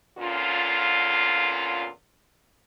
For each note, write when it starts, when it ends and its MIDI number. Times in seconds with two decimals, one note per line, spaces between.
0.18 1.87 40
0.18 1.87 46
0.18 1.87 50
0.18 1.87 61
0.18 1.87 65